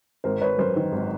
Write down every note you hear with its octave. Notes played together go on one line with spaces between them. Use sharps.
G#1 A#4 C5
G#1 B4 C#5
F#2 A#4 C5
D#3
G#1